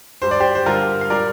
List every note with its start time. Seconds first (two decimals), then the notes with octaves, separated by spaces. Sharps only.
0.22 G2 G3 C5
0.31 D5
0.40 G4 C5
0.55 C5
0.66 G2 D3 G3 F4 A#4
1.01 F5
1.10 A#2 G3 A#4 D5